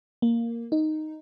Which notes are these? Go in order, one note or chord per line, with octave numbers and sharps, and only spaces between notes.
A#3
D#4